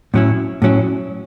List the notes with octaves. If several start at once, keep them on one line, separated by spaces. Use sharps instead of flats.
A2 F#3 C#4 E4
A2 F#3 C#4 E4